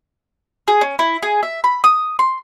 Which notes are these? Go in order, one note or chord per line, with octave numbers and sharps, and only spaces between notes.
G#4
C#4
E4
G#4
E5
B5
D#6
C6